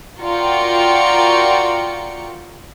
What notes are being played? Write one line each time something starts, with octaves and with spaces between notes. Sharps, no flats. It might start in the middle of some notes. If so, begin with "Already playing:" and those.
F4 F#4 A#4 D5 G5 C#7